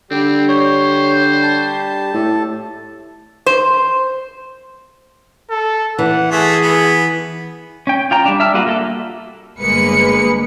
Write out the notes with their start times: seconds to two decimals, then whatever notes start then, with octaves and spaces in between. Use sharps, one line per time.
0.11 D3 G3 C4 G4
0.48 C5 C#5
1.43 A5
2.14 A2 A4
3.46 C5
5.50 A4
5.99 E3 F#5
6.32 A3 G#4
6.62 B3
7.87 C#4 G5
8.11 F4 G5 A#5
8.26 G3 D4
8.40 E5 A5 F6
8.54 G3 A#3 F4 F#4
8.67 A#3 A4 E5
9.59 G1 G#3 A#3 B4 C#7